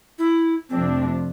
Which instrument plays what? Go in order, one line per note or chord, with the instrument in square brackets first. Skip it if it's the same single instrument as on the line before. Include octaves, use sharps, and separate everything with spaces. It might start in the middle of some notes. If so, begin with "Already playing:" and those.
[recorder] E4
[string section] F2 C3 F3 A3 D4 [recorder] C4